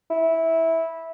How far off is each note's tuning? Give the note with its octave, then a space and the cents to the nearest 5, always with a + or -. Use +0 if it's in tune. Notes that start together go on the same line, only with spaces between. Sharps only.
E4 -15